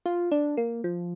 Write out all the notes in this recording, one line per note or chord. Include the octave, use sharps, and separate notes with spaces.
F4
D4
A#3
F3